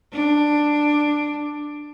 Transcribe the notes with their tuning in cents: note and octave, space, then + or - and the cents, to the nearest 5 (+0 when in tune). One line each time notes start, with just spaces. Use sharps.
D4 +10